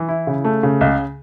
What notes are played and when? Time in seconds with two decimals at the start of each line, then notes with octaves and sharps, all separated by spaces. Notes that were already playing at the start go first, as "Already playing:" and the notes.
Already playing: E3
0.09 E4
0.27 C#3
0.45 A3
0.63 C#3
0.81 C#2